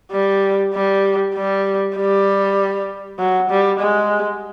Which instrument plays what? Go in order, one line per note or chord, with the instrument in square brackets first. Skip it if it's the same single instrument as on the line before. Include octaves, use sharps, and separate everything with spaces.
[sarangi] G3
G3
G3
G3
F#3
G3
G#3